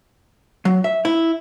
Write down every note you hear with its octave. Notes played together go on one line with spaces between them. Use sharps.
F#3
E5
E4